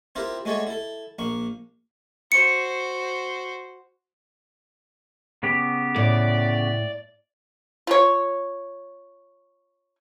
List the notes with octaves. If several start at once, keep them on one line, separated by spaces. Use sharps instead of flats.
C4 E4 F4 G4 A#4
G#3 A3 F#4 C#5 D5
E4 A4
A#1 A#3 C#6
F#4 C5 C#7
C#3 B3 G4
A2 D5
F4 C#5